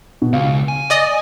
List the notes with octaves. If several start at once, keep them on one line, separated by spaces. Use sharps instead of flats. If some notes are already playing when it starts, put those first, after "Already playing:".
B2
C#2 F5
G#5
D5 D#5 D#6